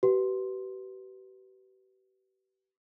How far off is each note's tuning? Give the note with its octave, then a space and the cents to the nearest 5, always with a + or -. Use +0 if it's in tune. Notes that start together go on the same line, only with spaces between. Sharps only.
G4 -40 B4 +0 C6 +0